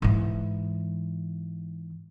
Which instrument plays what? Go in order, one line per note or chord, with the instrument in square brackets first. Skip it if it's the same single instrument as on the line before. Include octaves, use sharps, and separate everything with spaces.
[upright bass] G#2 E3